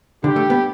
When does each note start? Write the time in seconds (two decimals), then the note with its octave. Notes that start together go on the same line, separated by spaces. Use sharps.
0.23 D3 G3 D4 G4
0.36 A3
0.50 B3